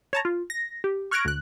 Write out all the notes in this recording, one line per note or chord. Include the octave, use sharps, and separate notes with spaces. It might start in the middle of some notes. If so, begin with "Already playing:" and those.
C#5 A5 A#5
F4
A#6
G4
C#6 F6 F#6 G#6 A#6 D7
D2 F#6